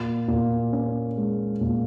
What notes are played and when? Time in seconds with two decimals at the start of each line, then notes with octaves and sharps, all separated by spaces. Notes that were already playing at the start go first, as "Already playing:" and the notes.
Already playing: A#2
0.28 A#2
0.73 C#4
1.17 G#3
1.61 A#2